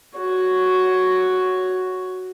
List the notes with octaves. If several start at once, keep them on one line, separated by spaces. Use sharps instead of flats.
F#4 C#5